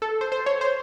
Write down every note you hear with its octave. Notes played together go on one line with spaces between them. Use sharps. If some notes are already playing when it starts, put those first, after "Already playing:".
A4
C5
C5
C#5
C5